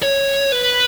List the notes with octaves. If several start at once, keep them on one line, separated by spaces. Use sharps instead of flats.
C#5
B4